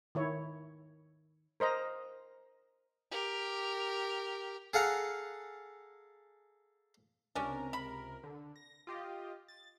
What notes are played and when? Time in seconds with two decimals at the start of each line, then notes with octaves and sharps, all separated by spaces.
0.15 D#3 E4 C#5
1.60 A#4 C5 D#5 A#5
3.11 G4 A#4
4.74 G#4 A4 F5 F#5 A#5
7.35 C#2 C3 C#4 D4 A#4
7.73 B5
8.23 D3
8.56 A#6
8.87 F4 G4 D#5
9.48 A6